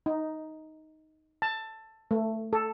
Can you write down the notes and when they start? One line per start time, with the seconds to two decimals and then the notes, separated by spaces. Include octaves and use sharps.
0.06 D#4
1.42 A5
2.11 A3
2.53 A4